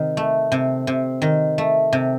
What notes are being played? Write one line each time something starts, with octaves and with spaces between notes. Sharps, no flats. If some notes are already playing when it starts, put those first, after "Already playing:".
Already playing: C3 D#3
A3
C3
C3
D#3
A3
C3